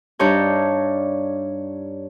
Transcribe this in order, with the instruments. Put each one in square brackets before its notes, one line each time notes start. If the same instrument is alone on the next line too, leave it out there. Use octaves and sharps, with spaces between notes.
[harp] G2 G3 D4 D#4 C#5 G6